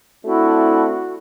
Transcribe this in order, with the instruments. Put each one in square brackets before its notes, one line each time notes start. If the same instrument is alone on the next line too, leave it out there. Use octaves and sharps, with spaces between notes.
[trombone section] A3 C4 D4 [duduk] E4 [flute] F#4